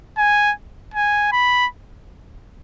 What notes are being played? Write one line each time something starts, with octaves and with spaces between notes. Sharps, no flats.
G#5
G#5
B5